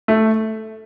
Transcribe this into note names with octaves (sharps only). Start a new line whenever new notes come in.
A3